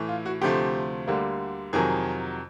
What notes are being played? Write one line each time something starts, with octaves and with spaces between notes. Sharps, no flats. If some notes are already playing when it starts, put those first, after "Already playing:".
Already playing: A2 E3 A3
F4
F#4
D2 C3 F3 A3 G4
D2 D3 G3 A#3
F2 C3 D#3 F#3 G#4